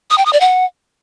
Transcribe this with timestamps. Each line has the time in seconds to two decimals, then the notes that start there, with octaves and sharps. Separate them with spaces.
0.10 D#6
0.18 G5
0.25 D#6
0.33 D5
0.41 F#5